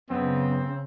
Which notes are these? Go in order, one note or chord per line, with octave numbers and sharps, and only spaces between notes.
F#2 C#3 B3 C4